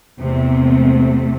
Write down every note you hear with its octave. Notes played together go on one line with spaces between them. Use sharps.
E2 C3 A3